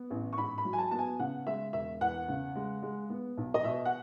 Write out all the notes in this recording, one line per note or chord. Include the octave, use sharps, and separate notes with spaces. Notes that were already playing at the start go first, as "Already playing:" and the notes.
Already playing: B3
A1
C#6
G#2 B5
B5
F#3
G#5
A5
B3 A5
G#5
C#3 F#5
G#3 E5
E1 E5
E2 F#5
C#3
G#3
G#3
B3
B1
D#5
B2 E5
F#5